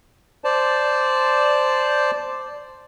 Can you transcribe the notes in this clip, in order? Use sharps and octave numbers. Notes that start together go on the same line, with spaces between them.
C5 D5 A5